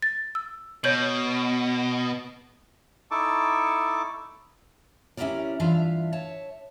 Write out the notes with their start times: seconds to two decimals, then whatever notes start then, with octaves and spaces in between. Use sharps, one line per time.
0.02 A6
0.35 E6
0.84 B2 C#5 G6 F#7
3.11 D#4 E4 A4 A5 C#6 D6
5.17 C#4 E4 F4 G4 A#4 D5
5.60 G2 E3 D4 F4 E5 F5
6.13 C#5 E5 A5